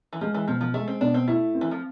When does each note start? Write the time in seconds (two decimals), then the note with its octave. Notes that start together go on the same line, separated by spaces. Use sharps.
0.13 E3
0.21 F3 G#3
0.34 E3
0.48 B2 F3
0.61 F3
0.74 G#3 A3
0.88 C4
1.01 B2 D4
1.14 C4
1.28 A3 E4
1.54 C4
1.61 E3
1.71 F3